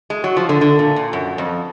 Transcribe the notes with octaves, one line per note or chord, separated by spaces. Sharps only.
G#3
F#3
F3
D3
D3
A#2
A#2
F#2
F2